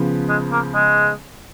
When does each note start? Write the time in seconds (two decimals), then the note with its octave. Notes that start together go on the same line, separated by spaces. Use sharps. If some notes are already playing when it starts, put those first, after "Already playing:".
Already playing: C#3 F3 B3
0.29 G#3
0.52 A#3
0.74 G#3